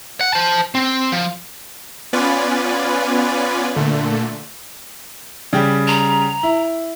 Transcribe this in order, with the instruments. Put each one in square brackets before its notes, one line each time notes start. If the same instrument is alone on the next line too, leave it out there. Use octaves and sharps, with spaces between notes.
[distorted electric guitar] F#5
C5 A5
C4
F3
[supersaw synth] B3 C#4 F4 B4 D5 G#5
A#2 D3 A3
[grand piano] C#3 G3 G5
[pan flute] A#5
[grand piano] E4